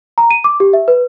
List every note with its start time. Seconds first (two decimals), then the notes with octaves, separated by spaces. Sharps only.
0.18 A#5
0.31 D#7
0.44 D6
0.60 G4
0.73 E5
0.88 B4